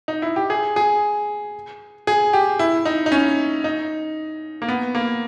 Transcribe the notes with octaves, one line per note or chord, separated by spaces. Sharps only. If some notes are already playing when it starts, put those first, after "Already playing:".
D#4
E4
G4
G#4
G#4
G#4
G4
E4
D#4
D#4
C#4
D#4
A#3
B3
A#3